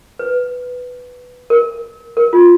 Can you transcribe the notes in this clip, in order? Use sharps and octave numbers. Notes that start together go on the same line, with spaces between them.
B4
A#4
A#4
F4